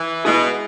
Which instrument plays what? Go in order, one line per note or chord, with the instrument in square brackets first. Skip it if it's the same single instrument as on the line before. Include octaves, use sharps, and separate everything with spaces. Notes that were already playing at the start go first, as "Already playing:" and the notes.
Already playing: [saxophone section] E3
[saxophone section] B2 [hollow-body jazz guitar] G#3 E4 G#4